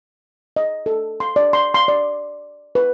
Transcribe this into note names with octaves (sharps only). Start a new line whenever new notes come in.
D#5
A4
C6
D5
C6
C6
D5
B4